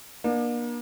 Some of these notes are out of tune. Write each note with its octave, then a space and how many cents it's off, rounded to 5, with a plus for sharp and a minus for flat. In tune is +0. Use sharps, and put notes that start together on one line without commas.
A#3 +40 D4 +35